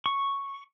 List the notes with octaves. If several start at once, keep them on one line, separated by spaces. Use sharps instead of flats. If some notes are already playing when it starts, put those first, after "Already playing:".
C#6